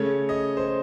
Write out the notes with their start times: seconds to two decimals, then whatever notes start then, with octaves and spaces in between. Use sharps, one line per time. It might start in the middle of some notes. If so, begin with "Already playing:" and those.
Already playing: C#3 A3 C#5
0.29 D#5
0.57 C5